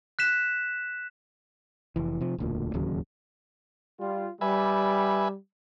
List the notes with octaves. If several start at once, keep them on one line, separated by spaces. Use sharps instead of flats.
F#6 B6 E7
F1 E3
C3 F3
E1 D2 A#2
D1 D#2 C#3 F#3
G3 F4
G3 B4 E5 G#5